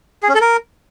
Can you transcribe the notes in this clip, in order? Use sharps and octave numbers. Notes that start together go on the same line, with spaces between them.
G#4
C#4
A4
A#4